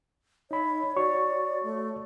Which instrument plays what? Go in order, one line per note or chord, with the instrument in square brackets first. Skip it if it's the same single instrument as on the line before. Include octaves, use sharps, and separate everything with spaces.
[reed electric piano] D#4 B5 [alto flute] C#5
[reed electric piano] F#4 C#5 C#6 [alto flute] D5
[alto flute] A3